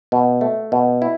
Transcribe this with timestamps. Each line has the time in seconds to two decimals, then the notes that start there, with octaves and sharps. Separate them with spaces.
0.12 B2
0.41 A3
0.72 B2
1.02 E4